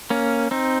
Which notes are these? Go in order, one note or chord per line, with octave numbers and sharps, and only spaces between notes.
A#3 C#4
C4 D#4